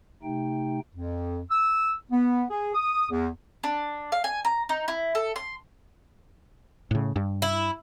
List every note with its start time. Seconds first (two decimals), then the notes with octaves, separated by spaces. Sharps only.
0.23 C3 A3 D#4 G5
0.96 F2
1.51 E6
2.12 B3
2.50 G#4
2.75 D#6
3.11 E2
3.64 D4
4.12 F5
4.24 G#5
4.45 A#5
4.69 D#4
4.88 E4
5.15 A4
5.36 C6
6.91 A2 C#3
7.16 G2
7.42 E4